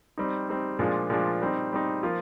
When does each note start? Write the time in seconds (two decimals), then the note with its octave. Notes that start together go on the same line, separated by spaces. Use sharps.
0.18 G3 C4 D#4
0.49 G3 C4 D#4
0.79 A#2 F3 G#3 D4 F4
1.10 A#2 F3 G#3 D4 F4
1.42 G3 C4 D#4
1.73 G3 C4 D#4
2.03 F3 A#3 F4